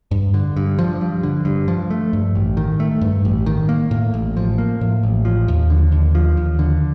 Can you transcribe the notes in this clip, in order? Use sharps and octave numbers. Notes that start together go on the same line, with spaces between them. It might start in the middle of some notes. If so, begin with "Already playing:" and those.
G2
D3
G2
F3
G2
D3
G2
F3
A3
G2
A1
D#3
A3
G2
A1
D#3
A#3
A2
A1
F3
A#3
A2
A1
F3
D#2
D3
D#2
F3
D#2
D3